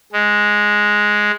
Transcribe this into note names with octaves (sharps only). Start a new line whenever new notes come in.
G#3